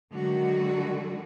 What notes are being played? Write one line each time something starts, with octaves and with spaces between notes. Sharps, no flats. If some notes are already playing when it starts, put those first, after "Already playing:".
D3 D#3 F#3 G#3 F#4